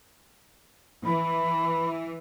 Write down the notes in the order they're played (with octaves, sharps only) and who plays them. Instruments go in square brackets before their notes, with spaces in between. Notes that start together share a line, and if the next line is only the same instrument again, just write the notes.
[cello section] E3 [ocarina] B5